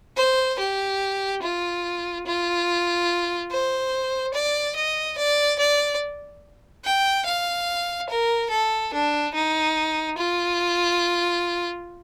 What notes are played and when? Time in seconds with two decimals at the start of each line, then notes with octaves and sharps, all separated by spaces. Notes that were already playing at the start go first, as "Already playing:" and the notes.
0.17 C5
0.59 G4
1.43 F4
2.26 F4
3.51 C5
4.34 D5
4.76 D#5
5.18 D5
5.58 D5
6.85 G5
7.26 F5
8.09 A#4
8.50 A4
8.93 D4
9.34 D#4
10.18 F4